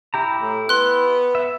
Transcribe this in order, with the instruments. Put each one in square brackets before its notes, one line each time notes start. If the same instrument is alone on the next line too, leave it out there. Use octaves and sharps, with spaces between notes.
[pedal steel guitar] E4 G4 A#5
[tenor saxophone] A2
[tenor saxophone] B3 [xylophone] C6 F#6
[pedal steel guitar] E5